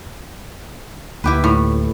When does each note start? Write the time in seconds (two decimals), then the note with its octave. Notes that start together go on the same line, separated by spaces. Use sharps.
1.24 D2 A#3 E4 G4 B4
1.44 A2